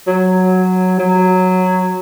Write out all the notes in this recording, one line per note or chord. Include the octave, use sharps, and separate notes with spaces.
F#3
F#3